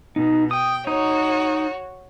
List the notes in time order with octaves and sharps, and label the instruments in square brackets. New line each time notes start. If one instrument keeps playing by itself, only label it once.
[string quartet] B2 [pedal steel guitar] D#4
[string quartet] G5 [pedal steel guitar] D#6
[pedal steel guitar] D#4 [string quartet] F#4 C#5